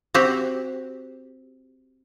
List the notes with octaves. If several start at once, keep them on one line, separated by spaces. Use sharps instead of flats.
C4 F#4 G4